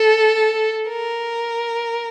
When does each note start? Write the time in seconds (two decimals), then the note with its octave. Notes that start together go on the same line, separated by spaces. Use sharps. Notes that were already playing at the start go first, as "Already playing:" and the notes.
Already playing: A4
0.88 A#4